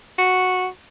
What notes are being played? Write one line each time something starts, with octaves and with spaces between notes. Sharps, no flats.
F#4